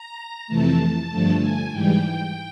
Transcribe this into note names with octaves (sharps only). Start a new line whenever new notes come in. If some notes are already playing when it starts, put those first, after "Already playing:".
Already playing: A#5
F2 C3 E3 A3 A5
A5
G2 D3 F3 A3
G#5
G#2 E3 G3 G5